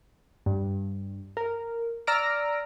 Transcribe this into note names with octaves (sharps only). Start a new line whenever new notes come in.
G2
A#4
D5 A#5 E6 F6 A#6 D7